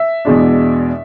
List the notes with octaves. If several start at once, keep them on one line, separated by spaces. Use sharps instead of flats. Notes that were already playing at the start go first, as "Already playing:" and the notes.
Already playing: E5
E2 B2 G#3 D4